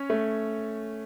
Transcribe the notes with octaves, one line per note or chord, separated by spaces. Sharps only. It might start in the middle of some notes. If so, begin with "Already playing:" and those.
Already playing: C#4 C#5
A3